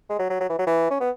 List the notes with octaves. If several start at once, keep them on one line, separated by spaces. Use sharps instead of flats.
G#3
F#3
F#3
F#3
E3
F#3
E3
C#4
B3